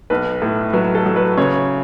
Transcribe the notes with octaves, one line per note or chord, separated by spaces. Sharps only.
B1 B4
A2
F#3 B4
A4
F#3
B4
C#3 C#5